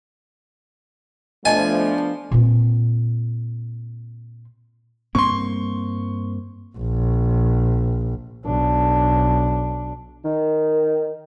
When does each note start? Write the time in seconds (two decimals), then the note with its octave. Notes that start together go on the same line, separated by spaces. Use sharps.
1.45 F3 A3 B3 D4 D#5 G#5 A5
2.31 A#2 C4
5.15 G2 A#3 C4 C6 C#6
6.77 A#1
8.44 B1 D4
10.24 D#3